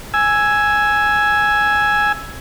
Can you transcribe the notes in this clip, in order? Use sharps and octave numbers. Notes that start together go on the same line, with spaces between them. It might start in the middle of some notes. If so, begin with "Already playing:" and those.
G#5 E6